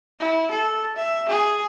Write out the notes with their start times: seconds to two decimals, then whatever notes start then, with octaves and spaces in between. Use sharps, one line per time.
0.20 E4
0.52 A4
0.97 E5
1.29 G#4